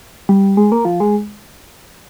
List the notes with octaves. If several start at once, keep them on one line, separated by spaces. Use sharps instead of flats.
G3
G#3
A#3
F3
G#3